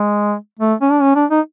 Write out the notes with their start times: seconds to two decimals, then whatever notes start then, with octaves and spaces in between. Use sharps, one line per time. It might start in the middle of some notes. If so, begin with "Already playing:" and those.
Already playing: G#3
0.59 A3
0.81 C#4
0.91 D4
1.01 C#4
1.16 D4
1.31 D#4